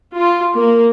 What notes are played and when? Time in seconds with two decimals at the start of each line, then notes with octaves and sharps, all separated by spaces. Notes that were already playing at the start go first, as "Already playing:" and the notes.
0.17 F4
0.54 A#3